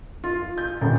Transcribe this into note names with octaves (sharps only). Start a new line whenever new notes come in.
F4
G6
D#1